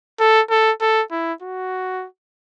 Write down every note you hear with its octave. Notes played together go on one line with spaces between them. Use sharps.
A4
A4
A4
E4
F#4